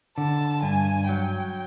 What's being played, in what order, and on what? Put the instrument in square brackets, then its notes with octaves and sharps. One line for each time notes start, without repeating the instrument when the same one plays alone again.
[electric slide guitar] D3 [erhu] A5
[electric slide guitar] G2 [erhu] G#5
[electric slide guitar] F#3 [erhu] G5